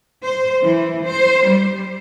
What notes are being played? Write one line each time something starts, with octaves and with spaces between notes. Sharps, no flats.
C5
E3
C5
G3